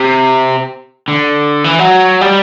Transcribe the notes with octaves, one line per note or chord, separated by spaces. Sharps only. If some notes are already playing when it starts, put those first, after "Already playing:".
Already playing: C3
D3
E3
F#3
G3